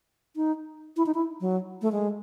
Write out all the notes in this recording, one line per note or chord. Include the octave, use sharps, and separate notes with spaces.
D#4
E4
D#4
E4
F#3
A3
G#3